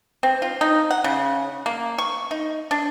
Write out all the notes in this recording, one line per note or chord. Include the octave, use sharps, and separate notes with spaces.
C4
F4
D#4
F#5
C#3
A#3
C#6
D#4
D4